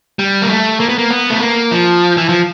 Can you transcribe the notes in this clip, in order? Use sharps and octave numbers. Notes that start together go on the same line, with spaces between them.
G3
A#3
A3
A#3
B3
A#3
B3
A3
A#3
F3
E3
F3